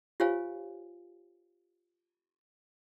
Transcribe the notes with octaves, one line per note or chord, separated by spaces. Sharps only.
F4 G4 C5 C#5 F5 G#5